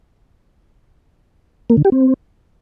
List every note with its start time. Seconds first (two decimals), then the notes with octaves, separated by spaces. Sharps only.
1.70 A#3
1.77 D3
1.85 G4
1.92 C4